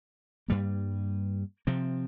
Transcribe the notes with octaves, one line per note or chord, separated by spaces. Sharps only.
G2 G3 A#3
C3 F3 C4